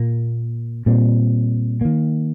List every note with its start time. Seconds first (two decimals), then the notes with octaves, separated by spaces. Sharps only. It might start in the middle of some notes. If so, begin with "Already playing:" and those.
Already playing: A#2 A#3
0.86 A#2 G3 C4
1.81 D#3 A#3